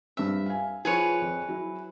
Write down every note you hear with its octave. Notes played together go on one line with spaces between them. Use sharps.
G2 C4 E5
F5 G#5
F3 G#4 B4 C#5
F2
F#3 E4